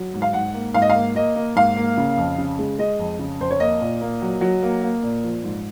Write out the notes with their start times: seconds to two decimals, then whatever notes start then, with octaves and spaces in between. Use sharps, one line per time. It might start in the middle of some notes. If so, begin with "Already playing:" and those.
Already playing: F#3
0.14 G#2
0.22 F5
0.33 G#2 F#5
0.54 A#3
0.74 G#2 F5
0.82 D#5
0.90 F5
0.95 A#3
1.15 A#3 D#5
1.36 A#3
1.56 G#2 F5
1.76 A#3
1.97 C#3
2.17 F2
2.38 C#3
2.59 G#3
2.78 G#3 D#5
2.99 F2
3.19 C#3
3.39 F2 C5
3.51 C#5
3.60 A#3 D#5
3.81 A#2
4.01 A#3
4.22 F#3
4.41 F#3
4.63 A#3
4.83 A#3
5.03 A#2
5.23 F3
5.43 G#2